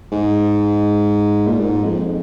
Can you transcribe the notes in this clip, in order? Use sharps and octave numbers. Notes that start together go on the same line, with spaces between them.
G#2
A#2
G#2
F2